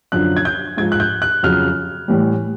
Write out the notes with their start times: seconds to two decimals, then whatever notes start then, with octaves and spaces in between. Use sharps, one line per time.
0.12 F#2 D3 F3 F#6
0.37 G#6
0.45 G6
0.77 G#2 F3 G#6
0.92 F#6
1.00 G6
1.22 F#6
1.43 F2 C#3 F#3 F6
2.08 A2 E3 G3